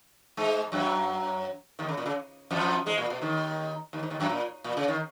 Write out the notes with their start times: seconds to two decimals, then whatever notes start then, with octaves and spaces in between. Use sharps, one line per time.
0.37 G#2 G#3
0.72 F#2 F#3
1.79 D#2 D#3
1.89 C#3
1.97 A#2
2.06 C#3
2.51 F2 F3
2.86 G#2 G#3
2.98 A#2
3.10 B2
3.22 D#2 D#3
3.93 D#2 D#3
4.03 G#2
4.10 D#2 D#3
4.20 F#2 F#3
4.29 A#2
4.64 A#2
4.77 C#3
4.88 D#3